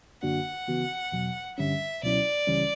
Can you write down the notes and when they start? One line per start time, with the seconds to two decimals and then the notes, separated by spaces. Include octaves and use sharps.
0.23 F#2 D3 A#3 D4 F#4 F#5
0.68 C#3 E3 B3 F#4
1.12 E2 B2 F#3
1.58 G2 D3 G3 C#4 E5
2.03 C#2 B2 F#3 C#4 E4 D5
2.47 C#2 C#3 E3 G3 C#4